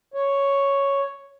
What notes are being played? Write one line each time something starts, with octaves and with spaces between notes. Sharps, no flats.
C#5